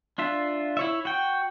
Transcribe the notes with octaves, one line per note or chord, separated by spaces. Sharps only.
D4 F4 E5
E4 C#5 E5
F#4 G5